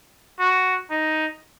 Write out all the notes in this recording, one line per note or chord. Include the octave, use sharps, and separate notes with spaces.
F#4
D#4